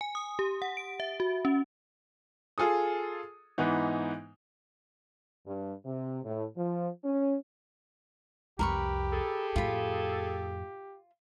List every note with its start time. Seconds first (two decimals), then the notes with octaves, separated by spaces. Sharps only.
0.01 G#5
0.15 D#6
0.39 G4
0.62 F#5
0.77 D7
1.00 E5
1.20 F#4
1.45 C#4
2.58 F4 G#4 A4 D#6
3.58 G#2 E3 B3 D#4
5.46 G2
5.85 C3
6.24 A2
6.56 F3
7.04 C#4
8.59 C2 F2 G4 A#4 B4 C#6
9.13 G#4 A4
9.56 F2 A2 F4 B5